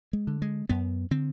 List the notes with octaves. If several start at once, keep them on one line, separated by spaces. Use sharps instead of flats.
G#3
D3
G#3
F#2 B3
D3 C4